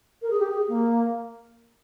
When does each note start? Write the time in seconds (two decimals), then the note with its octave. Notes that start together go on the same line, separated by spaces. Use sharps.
0.22 A#4
0.30 G#4
0.40 G4
0.49 G#4
0.68 A#3